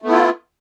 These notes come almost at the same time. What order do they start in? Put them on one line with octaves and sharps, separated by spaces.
A3 B3 E4 F4